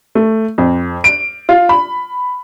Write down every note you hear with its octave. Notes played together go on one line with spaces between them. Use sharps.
A3
F2
D7
F4
B5